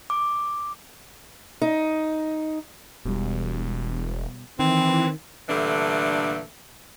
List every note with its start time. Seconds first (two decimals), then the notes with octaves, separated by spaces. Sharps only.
0.10 D6
1.62 D#4
3.05 E1 B2 G3
4.59 D#3 E3 C4
5.49 A#2 D3 E3 G3 A3 D4